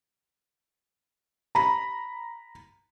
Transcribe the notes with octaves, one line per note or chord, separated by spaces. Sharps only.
A#5 B5